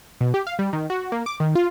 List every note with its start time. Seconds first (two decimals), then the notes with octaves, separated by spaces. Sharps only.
0.21 B2
0.34 G4
0.47 F5
0.59 G3
0.73 D#3
0.90 F#4
1.12 A#3
1.26 D6
1.40 D#3
1.55 F4